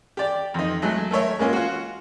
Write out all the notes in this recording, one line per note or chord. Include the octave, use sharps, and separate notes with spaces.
G4 D5
F2 D#4
F#3 G#3 A3
A3 A#4 C#5 E5
G#3 A#3 C#4 F4
F4 F#4